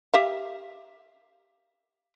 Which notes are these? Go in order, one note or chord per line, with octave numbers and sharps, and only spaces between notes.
G4 E5 F5